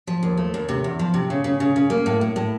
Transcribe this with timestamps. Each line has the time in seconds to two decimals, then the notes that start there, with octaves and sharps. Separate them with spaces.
0.07 F3
0.23 D#2
0.37 A3
0.54 D#2
0.69 C3
0.84 E2
0.99 F3
1.14 C3
1.30 C#3
1.44 C#3
1.60 C#3
1.76 C#3
1.90 A#3
2.06 A2
2.21 A2
2.36 A2